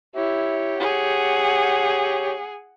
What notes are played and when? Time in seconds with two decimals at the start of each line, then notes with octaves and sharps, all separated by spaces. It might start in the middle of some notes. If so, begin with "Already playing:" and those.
0.16 E4 G4 C#5
0.80 G#4 F#5